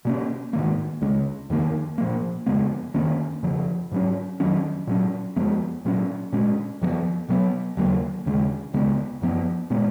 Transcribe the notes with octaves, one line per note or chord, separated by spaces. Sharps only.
B2 A#3 C#4
G#2 D#3 A#3
C#2 C#3 G#3
F2 D#3 A#3
A#2 F3 A#3
F2 C#3 G#3 B3
F2 D#3 A#3 C#4
F2 C#3 F3
G#2 F#3 C#4
F2 D#3 F#3 C#4
A#2 F#3 C#4
F2 F3 G#3 B3
A#2 F#3 C#4
A#2 G#3 C#4
F2 F3 G#3 B3
B2 F#3 B3
D#2 C#3 F#3 A#3
D#2 C#3 G#3
C#2 C#3 G#3 B3
F#2 F3 B3
A#2 G#3 B3